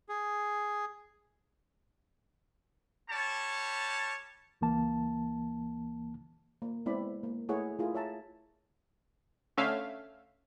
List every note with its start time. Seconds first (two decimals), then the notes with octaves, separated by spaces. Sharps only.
0.09 G#4
3.10 G3 C#5 A5
4.61 C#2 E3 A#3 A5
6.62 A#3
6.86 G#3 B3 C4 E4 D5 B5
7.23 A#3
7.49 A3 E4 G#4 B4 C#5 F#5
7.79 A3 E4 F4 G#4 A#4
7.95 C#5 E5 A5 A#5
9.57 D3 A3 C#4 E5 F5